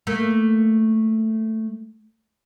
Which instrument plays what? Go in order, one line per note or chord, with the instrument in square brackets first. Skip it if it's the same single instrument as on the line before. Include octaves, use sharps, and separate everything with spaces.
[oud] A3 A#3